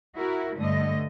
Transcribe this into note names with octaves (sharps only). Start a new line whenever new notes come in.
E4 F#4 A#4
G2 D3 A3 D#5